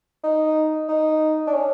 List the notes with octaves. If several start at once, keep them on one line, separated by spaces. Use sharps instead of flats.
D#4
D#4
D4
C#4